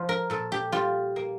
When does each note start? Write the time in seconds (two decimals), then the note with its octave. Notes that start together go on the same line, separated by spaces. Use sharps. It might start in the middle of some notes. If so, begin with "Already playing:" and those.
Already playing: F3 C5
0.09 A#4
0.30 A#2 A4
0.52 G4
0.72 G3 F4
1.16 A#3